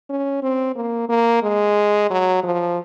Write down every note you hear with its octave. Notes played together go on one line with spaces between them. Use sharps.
C#4
C4
A#3
A#3
G#3
F#3
F3